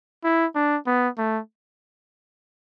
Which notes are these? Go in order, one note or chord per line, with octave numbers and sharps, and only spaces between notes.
E4
D4
B3
A3